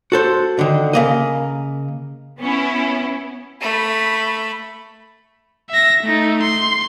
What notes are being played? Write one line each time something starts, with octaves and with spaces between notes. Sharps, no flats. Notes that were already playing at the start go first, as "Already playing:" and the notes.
F#4 A4 C5
D3 D#3
C#3 A#3 D#5
B3 C#4 E4
A3 B5
E5 A#6
A3 D#4
C6